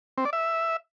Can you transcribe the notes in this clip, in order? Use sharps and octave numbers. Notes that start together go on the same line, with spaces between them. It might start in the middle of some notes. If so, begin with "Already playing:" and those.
C4
D5
E5